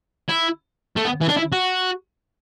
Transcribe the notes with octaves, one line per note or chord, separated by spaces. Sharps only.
E4
A3
B3
E3
D4
E4
F#4